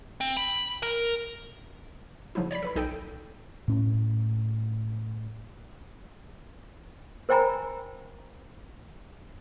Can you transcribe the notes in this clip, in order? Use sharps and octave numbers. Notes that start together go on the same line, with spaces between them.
C4
B5
A#4
C#3 F3 F#3 D#4 E4
C#5 D5 B5 B6
A4 B4 B5
B1 D#4 A4 G5 G6 D7
A2 C#4
A#4 C5 G5 G#5 A#5 B5